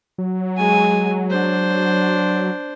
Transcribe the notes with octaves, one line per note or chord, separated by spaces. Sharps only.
F#3
G#3 G#5
D4 C5